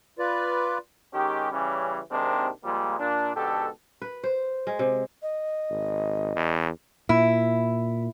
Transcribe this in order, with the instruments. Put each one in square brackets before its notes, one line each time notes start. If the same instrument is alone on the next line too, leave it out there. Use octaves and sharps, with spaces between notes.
[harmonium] F4 B4 D5
[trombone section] D#3 G#3 C#4 D#4 G4
C#3 E3 G3 C#4
D#2 C3 D#3 G#3 C4 D4
A#2 F3 G3 G#3 A#3
A#2 D4
G#2 B2 D3 G4 A4
[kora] B4
C5
G#3
C3
[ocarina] D#5
[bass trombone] G#1
E2
[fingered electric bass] A#2 [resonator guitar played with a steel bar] E4